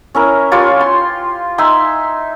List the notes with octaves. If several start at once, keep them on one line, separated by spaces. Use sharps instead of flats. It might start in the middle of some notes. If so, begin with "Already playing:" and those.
C#4 E4 A#4
F4 G4 B4 C#5
C6
D#4 E5 G#5 C6